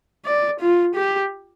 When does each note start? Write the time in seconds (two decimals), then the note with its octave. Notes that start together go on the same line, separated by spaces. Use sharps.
0.25 D5
0.60 F4
0.95 G4